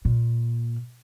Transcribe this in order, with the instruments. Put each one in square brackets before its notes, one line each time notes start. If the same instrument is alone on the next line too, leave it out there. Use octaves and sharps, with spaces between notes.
[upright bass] A#2